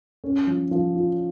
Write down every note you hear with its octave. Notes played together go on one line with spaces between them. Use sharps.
C#4
F3
F3
F4